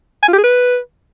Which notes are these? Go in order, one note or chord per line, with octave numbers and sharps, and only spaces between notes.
G#5
F4
G4
G#4
B4